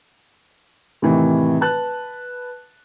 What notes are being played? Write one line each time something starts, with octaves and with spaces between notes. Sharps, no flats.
A2 C3 D#3 E3 D#4
B4 A5 F#6 A6